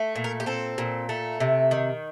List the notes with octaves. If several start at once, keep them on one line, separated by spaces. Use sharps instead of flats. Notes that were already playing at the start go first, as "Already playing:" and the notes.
Already playing: A3
A#2
A#4
G4
C4 A4
A#2
A3
C3
D#3